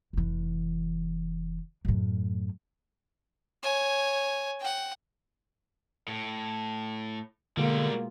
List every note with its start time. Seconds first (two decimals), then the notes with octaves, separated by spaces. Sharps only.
0.13 F1 E3
1.85 F#2 A2
3.63 C#5 G#5
4.60 F#5 G5
6.08 A2
7.57 B2 D3 G3 G#3 A#3 F4 F#4